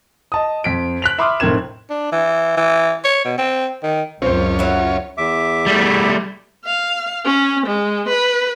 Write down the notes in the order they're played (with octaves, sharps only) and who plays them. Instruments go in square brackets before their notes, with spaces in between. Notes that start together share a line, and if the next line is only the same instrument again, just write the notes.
[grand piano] D#5 A5 D#6
F2 B6 D7
F#6 B6 F7
E5 B5 C6 D6 D#6 F6
F1 A2 C4 A#4 G#6 E7
[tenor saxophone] D4
E3
E3
C#5
B2
C4
D#3
[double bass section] C#2 F#2 [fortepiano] C4 C5 [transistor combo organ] C#4 F4 C#5
[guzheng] F#3 E4
[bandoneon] E2 E5 D6
[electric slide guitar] G3 A3
[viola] F5
C#4
G#3
B4